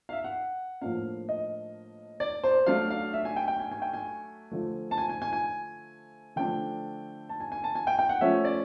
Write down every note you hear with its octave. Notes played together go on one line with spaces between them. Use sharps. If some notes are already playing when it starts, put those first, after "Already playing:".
F5
E5
F#5
A2 F3 A#3 D4 F5
D#5
D5
C5
F#3 A3 D4 F5
F5
E5
G#5
G5
G5
G#5
G#5
G5
G#5
D3 F3 A3
A5
G#5
G#5
G#5
G#5
D3 F3 A3 D4 G5
A5
G#5
G#5
A5
G#5
G5
G5
F#5
F3 A3 C#4 E5
D5